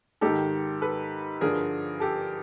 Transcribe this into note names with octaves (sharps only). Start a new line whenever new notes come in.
G#2 D#3 G4 A4
A4 B4
G2 D3 F3 G#4 A#4
G4 A4